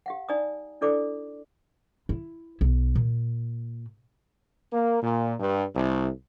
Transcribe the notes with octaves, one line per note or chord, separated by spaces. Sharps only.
G4 F5 F#5
D#4 D5 G#5 A#5 D#6
D4 E4 A4 D5 D6
E4
B1
A#2
A#3
A#2
G2
C2